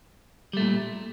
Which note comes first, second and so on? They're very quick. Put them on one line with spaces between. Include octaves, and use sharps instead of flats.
G3 A3 A#2